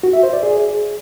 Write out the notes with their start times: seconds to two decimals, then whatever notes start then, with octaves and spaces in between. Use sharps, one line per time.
0.03 F#4
0.13 E5
0.23 C5
0.33 D5
0.43 G#4